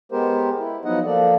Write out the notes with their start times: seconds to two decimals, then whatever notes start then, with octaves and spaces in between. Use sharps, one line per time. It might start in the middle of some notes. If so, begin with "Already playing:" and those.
0.12 G#3 B3 G4 A#4 C5
0.59 E4
0.85 F3 F#3 B3 D#4 D#5 F#5
1.05 F3 A#3 A4 D5